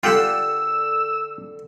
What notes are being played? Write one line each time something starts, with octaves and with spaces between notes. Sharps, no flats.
D3 F4 G4 A4 F#5 G5 E6